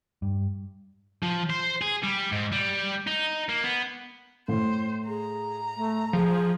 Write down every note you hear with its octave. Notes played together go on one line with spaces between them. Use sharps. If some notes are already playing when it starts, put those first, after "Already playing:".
G2
F3
C5
G#4
G3
G#2
G3
D#4
A#3
B3
A2 C5
G#4 A#5
A3
F3 G#4